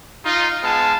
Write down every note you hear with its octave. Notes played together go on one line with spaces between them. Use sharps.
D#4 F4
G#3 B3 F5 A5